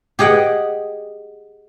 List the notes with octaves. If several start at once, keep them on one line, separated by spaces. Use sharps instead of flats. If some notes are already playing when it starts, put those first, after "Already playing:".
G4 G#4 D#5 F#5 G5